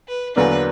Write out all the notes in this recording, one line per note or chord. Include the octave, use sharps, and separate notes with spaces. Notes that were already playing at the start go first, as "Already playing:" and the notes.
B4
E2 D3 F#3 A#3 D4 B4